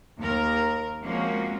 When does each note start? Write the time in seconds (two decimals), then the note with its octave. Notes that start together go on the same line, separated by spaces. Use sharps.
0.18 D#2 A#4
1.03 F3 G#3 A#3 C4 C#4 F#4